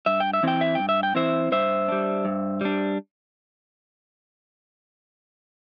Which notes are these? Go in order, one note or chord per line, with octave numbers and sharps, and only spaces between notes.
G2 E5
G5
E5
E3 C4 E4 G5
E5
G2 G5
E5
G5
E3 C4 E4 C5 E5
G2 C5 E5
G3 D4
G2
G3 D4